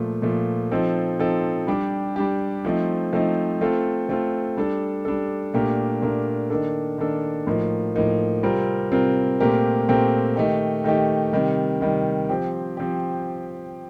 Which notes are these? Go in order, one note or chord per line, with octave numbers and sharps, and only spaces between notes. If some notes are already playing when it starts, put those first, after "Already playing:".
Already playing: A#2 F3 A3
A#2 F3 A3
F3 C4 D#4 A4
F3 C4 D#4 A4
G3 D4 G4
G3 D4 G4
F3 A3 C4 D#4
F3 A3 C4 D#4
A3 C4 F4 A4
A3 C4 F4 A4
G3 D4 A4
G3 D4 A4
A#2 A3 D4 G4 A#4
A#2 A3 D4 G4 A#4
D#3 A#3 D4 A4
D#3 A#3 D4 A4
A2 F3 A#3 D#4
A2 F3 A#3 D#4
C3 G3 C4 F4 A#4
C3 G3 C4 F4 A#4
A#2 A3 C4 G4 A#4
A#2 A3 C4 G4 A#4
D#3 A3 D#4 G4
D#3 A3 D#4 G4
C3 D#3 G3
C3 D#3 G3
F3 C4 G4
F3 C4 G4